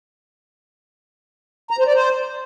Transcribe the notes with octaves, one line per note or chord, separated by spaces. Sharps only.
A#5
C5
D5
C5